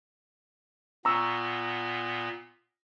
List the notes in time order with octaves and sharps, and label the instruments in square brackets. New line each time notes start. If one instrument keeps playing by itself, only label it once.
[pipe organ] A#2 B3 [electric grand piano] A#5 C#6 E6